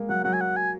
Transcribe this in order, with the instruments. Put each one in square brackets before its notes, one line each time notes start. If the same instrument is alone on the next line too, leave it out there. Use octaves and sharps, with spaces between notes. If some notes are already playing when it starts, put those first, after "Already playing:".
Already playing: [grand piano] G#3 A#3
[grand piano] F#3 [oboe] F#5
[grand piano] F#3 [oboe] F#5
[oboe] G#5
F#5
G#5